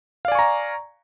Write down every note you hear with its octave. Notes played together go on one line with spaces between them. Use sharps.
D5 F5 G#5 A#5 C#6